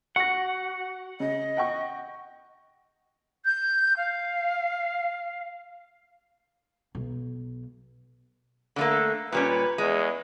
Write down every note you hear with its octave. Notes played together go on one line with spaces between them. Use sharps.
F#4 F#5 C#6 A#6
C#3 D#5
F#5 G5 C#6
G6
F5
B1
D3 A3 A#3
A#2 G3 C#4 B4
E2 G#3